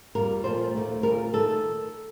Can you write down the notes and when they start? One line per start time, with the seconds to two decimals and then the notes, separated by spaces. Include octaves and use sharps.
0.15 F2 D#3 G3 A#3 A#4
0.44 A#2 F3 A3 C5
0.74 D#2 D#3 A3
1.03 A#2 A3 A#4
1.33 D#3 A3 A4